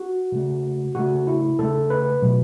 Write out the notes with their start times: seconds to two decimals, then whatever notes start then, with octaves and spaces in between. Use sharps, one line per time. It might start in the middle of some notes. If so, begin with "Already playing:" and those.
Already playing: F#4
0.32 C#3 A3
0.95 C#3 A3 F#4
1.27 E4
1.59 C#3 A3 A4
1.90 B4
2.22 B2 F#3 A3